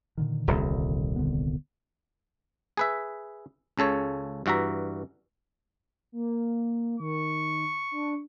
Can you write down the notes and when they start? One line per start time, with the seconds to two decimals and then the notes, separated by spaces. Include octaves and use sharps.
0.17 A#2 D3 D#3
0.47 D#1 C2
1.16 D3 B3
2.77 G#4 B4 E5
3.77 C#2 C#3 A4 C#5
4.46 G2 E3 F#4 E5 A#5
6.12 A#3
7.00 D#3 C#6
7.91 D4